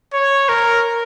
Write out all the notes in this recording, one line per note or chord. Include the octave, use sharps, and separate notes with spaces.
C#5
A#4